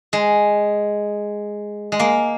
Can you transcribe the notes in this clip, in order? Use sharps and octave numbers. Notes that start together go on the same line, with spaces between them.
G#3
G#3
A#3